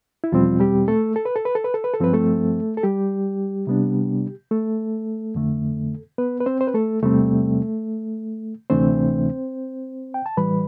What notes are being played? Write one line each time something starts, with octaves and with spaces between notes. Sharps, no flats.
E4
E2 B2 F3 G3 C4 F4
G3 G4
A3 A4
A4
B4
A4
B4
A4
B4
A4
B4
A4
G2 F3 C4 B4
A3 A4
A4
G3 G4
C3 G3 B3 D4
A3 A4
F2 D3 A3
B3 B4
B4
C4 C5
C5
B4
A3 A4
E2 C3 G3 A3 C4 A4
D2 C3 E3 A3 C4 D4 C5
G5
A5
A2 E3 G3 B4 B5